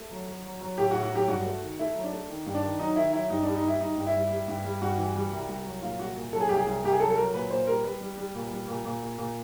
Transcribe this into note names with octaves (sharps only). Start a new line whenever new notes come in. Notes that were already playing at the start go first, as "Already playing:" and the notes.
Already playing: A3
F#3
F#3
F#3
F#3
A2 G4
F#4
A2
F#4
F#3 G4
G2 F#4
A3
D#3
A3 E4
F#3
D4
A3
D#3
G2
D4
D#3
F#3 D#4
D#3 E4
F#3 E4
G2 D#4
G3 D4
D#4
G3 E4
G3 D#4
G2
E4
G3
G3
G2
G3
G2 F#4
E3
G3
C2
C2
F#3
A#2 F4
C2 F#4
A#2
F#3 A4
G#4
C2 G4
G#4
C2
C2 G4
G#4
F#3 A4
A4
F#3 A#4
A#2 B4
A#2 C5
G3 A#4
G3 B4
G3
G3
A#2
G3
A#2
A#2
A#2
A#2